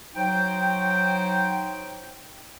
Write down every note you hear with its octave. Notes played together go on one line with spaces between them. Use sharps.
F#3 D#4 C5 G5